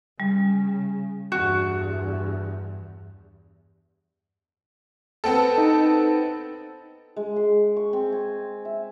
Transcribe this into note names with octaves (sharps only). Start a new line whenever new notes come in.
C#3 G3
E2 G2 F#4
B3 C4 A4
D#4
G#3
C6
C#6
C4
G#5
E5